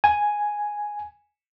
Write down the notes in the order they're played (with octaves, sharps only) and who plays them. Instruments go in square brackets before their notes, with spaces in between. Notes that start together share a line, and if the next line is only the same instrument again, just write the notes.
[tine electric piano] G#5